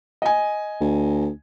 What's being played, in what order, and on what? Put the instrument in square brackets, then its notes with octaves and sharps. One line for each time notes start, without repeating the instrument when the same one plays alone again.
[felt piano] D#5 G#5
[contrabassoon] D2